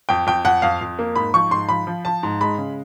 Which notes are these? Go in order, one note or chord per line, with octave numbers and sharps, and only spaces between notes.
F2 G5
F2 G5
F2 F#5
F2 F5
F2
A#3
G#2 B5
F3 C#6
G#2 C6
F3 B5
F3
F3 A5
G#2
G#3 B5
C#3